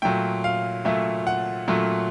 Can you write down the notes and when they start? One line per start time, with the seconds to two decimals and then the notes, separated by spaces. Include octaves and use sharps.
0.02 A#2 F#3 A3 G5
0.44 F5
0.85 A#2 F#3 A3 E5
1.27 F#5
1.68 A#2 F#3 A3